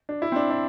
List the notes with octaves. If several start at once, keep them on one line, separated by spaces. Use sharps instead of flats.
D4
E4
C4
D4
D4